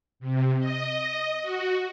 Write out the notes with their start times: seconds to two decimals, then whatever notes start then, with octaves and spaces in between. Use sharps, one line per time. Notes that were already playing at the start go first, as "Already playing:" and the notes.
0.20 C3
0.59 D#5
1.42 F#4